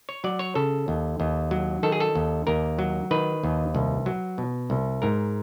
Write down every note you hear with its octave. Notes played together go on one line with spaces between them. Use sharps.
C#5
F#3 D5
C#5
C#3 A4
D#2
D#2
F#3
D#3 A4
G#4
A4
D#2
D#2 A#4
F#3
D#3 B4
D#2
C2
F#3
B2
C2
G#2 A#4